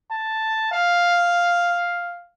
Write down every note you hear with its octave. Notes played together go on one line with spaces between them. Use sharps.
A5
F5